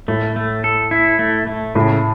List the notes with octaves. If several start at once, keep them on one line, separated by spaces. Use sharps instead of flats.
A2 A3
A3
A4
E4
A3
A3
A2 C#3